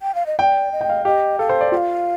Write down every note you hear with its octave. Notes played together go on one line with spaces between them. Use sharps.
G5
F5
D#5
D5 G5
D#5
G5
F5
G4 D#5
A4 F5
C5
D5
F4 G5
F5